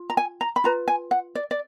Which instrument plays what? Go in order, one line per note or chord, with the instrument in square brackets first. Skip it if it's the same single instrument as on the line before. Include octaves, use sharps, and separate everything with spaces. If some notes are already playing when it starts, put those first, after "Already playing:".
Already playing: [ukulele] F4
A#5
G#5
A#5
B5
F4 B4 A#5
G#5
F#5
D5
D5